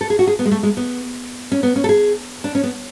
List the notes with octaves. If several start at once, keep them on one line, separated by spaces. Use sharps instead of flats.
A4
G#4
F#4
G#4
B3
G#3
A3
G#3
B3
C#4
B3
C#4
A4
G#4
D4
C#4
B3